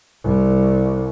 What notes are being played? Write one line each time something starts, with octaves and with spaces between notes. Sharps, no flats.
C2 G3